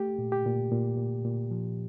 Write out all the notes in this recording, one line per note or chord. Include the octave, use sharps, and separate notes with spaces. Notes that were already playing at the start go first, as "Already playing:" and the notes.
Already playing: A3 G4
A#2
G4
A#2
A#2
A#2
A#2
F3